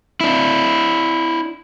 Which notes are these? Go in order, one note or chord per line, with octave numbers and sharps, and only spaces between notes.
D4 E4